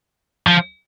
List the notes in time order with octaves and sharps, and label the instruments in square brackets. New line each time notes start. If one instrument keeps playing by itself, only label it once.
[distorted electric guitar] F3